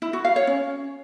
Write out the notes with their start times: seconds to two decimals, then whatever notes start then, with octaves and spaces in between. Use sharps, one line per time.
0.02 E4
0.13 F#4
0.25 F5
0.36 C#5
0.47 C#4